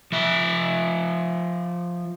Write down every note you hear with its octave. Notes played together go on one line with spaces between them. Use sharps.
F3 E5